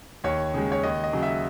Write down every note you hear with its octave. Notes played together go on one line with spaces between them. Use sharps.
D#2 C#5
C#3 G#3
C#5
D#2 D#5
D#5
C#3 F#3
E5